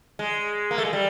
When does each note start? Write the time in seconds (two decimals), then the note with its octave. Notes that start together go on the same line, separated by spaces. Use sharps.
0.19 G#3
0.71 A#3
0.78 A3
0.85 G#3
0.93 G3